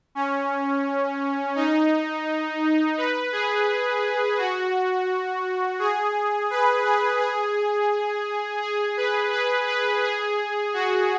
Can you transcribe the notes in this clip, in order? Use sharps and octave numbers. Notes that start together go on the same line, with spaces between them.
C#4
D#4
B4
G#4
F#4
G#4
B4
G#4
G#4
G#4
B4
B4
B4
G#4
F#4